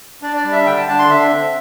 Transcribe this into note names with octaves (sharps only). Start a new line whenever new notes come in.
D4 D5
D5
G3
E5
D3 G5
A5
D4 A5
C6
D3 E5
C4